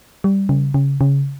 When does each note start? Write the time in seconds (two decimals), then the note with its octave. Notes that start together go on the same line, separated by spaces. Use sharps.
0.24 G3
0.49 C#3
0.74 C#3
1.01 C#3